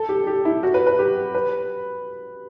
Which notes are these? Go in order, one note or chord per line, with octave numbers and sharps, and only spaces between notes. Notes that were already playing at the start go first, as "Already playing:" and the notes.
Already playing: A4
G4
G4
E4
F#4
B4
B4
G4
B4